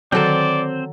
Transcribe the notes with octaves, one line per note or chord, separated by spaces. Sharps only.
D3 D#3 F#3 C4 A4 C5 D5